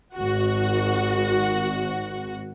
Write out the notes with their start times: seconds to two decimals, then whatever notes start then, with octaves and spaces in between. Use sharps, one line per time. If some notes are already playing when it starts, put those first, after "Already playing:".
0.15 G#1 F#4